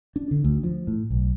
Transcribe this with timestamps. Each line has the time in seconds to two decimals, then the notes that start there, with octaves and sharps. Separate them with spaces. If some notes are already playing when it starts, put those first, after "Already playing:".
0.16 D4
0.31 D3
0.44 D2
0.64 F3
0.87 A2
1.10 B1